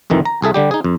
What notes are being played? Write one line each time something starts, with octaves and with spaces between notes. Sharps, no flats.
C2 F2 D#3 E3
A#5
C2 G#4 A4 E5
D3 G3 G4
D#4 G#4
F2